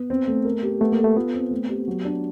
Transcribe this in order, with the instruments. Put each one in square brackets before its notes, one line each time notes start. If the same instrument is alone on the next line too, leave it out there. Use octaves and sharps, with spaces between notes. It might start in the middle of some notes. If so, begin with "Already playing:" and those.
Already playing: [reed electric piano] B3
[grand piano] C4
A3
A#4
G4
[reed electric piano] A3 [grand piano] B3
[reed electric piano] A#3
[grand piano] A4
[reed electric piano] A3
[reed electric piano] B3 [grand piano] F4
[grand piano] C4
A3
G4
F#3
D4